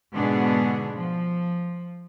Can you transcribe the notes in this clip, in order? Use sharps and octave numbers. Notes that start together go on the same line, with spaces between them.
G#2 B2 D3 B3 D4 G#4
F3